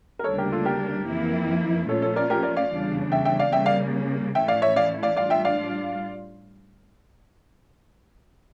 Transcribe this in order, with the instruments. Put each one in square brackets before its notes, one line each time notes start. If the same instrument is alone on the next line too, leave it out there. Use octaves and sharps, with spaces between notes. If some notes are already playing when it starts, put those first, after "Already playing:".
[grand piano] A#4
[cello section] D2 C#3 G3 A#3 D4 [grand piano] A4 C#5
[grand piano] G4 A#4
F4 A4
G4 A#4
[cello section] F2 E3 A#3 E4
[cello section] A#2 F3 A3 C#4 F4 [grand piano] A4 C#5
[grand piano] A4 C#5
A#4 D5
G4 A#4
A#4 D5
D5 F5
[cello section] E2 C#3 G3 D4
[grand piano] E5 G5
E5 G5
D5 F5
[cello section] C#3 G3 A#3 [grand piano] E5 G5
[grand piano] D5 F5
[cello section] A2 E3 A3 C#4 E4 [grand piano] E5 G5
[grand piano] D5 F5
C#5 E5
D5 F5
D5 F5
[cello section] A2 G3 D4 F4 [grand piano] D5 F5
[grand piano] E5 G5
D5 F5